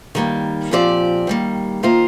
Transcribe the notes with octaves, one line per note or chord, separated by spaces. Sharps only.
D#3 G3 A#3
A#2 F3 C4 G4 D5
D#3 G3 A#3
D#3 A#3 F4 C5 F5